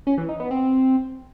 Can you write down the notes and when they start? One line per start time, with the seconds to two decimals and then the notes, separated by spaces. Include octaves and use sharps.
0.07 C#4
0.18 E3
0.29 D#4
0.40 B3
0.51 C4